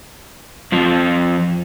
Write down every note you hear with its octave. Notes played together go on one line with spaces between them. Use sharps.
F2 F3